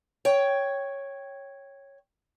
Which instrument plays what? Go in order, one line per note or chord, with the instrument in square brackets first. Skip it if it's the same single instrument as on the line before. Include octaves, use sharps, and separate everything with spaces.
[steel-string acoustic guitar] C#5 G5